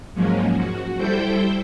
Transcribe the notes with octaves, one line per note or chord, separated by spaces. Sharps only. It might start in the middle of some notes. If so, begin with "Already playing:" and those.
G#2 F3 F#3 G#3 A#3 C#4
F#4
G3 E4 A4 C5 G5 G6